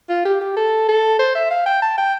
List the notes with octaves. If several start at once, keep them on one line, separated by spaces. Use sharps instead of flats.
F4
G4
G4
A4
A4
C5
E5
F5
G5
A5
G5